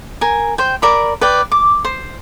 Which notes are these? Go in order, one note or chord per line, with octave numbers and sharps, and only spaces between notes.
A#4 G#5
C5 G5
A#4 D5 B5
B4 D5 G5
D6
C5